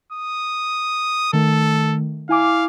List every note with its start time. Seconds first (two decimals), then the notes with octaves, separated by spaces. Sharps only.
0.12 D#6
1.33 D#3 A3 A4
2.29 E4 F5 G#5 D6